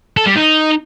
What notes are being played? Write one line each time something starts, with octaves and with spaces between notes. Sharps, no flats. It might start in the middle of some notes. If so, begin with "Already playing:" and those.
A4
G3
D#4